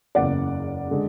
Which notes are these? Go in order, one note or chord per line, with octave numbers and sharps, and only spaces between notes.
F#1 E2 C#3 D5 F#5
D3 G#3